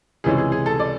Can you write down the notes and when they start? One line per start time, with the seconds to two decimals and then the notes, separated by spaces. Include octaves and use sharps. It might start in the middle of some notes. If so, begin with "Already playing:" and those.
0.24 C#2 C3 E3 G#3 C#4 G#4
0.38 G#4
0.52 G#4
0.66 A4
0.80 D5